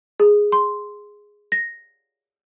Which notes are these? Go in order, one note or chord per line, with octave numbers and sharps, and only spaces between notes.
G#4
C6
A#6